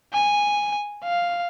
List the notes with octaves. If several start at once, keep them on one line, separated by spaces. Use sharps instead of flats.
G#5
F5